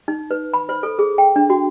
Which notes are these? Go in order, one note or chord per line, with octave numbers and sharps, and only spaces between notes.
D#4
B4
B5
C5
A4
G#4
G5
D4
F#4